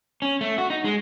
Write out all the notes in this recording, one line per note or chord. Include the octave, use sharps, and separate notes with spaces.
C#4
A3
F#4
D#4
G#3